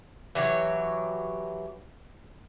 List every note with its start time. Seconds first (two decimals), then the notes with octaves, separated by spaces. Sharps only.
0.35 E3 F#3 G4 C#5